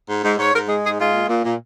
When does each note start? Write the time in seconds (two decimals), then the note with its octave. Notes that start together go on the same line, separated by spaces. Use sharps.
0.09 G#2
0.24 G#2
0.38 G#2 C#5
0.53 G#2 A#4
0.68 G#3 G#4
0.83 G#2 G#4
0.99 G#3 F4
1.14 A#2
1.29 A#2
1.44 A#2